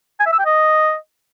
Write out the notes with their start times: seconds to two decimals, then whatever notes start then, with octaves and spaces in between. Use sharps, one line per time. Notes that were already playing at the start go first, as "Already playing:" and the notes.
0.20 G#5
0.26 E5
0.33 E6
0.39 G5
0.46 D#5